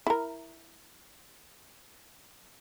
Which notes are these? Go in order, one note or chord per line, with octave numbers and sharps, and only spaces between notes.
E4 A#4